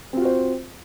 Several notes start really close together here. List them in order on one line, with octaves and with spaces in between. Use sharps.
C4 F4 F#4 C5